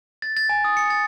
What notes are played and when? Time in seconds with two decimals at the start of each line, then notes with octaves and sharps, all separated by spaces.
0.22 A6
0.37 A6
0.49 G#5
0.64 D#6
0.77 C#7
0.90 A6